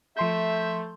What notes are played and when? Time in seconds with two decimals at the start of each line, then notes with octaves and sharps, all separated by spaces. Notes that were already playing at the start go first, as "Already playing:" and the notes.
0.17 F3 A3 E5 C6 G6